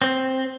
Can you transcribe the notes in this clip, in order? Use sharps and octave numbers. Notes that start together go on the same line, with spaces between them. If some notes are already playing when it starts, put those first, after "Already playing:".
C4